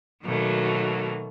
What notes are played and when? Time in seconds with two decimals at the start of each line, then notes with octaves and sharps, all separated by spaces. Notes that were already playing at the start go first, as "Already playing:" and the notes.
0.25 B2 D#3 F#3 A3 A#3